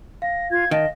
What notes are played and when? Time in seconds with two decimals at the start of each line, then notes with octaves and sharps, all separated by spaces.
0.22 F5 A#6
0.51 F4 G#6
0.71 D#3 D#5 A5